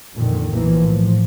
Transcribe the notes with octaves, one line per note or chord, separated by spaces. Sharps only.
F2 A#2 D3 D#3
B1 A#2 E3 F3 A#3
A2 F3